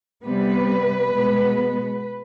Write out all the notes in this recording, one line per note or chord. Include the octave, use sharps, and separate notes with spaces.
C3 G3 B3 B4
B2 G#3 B3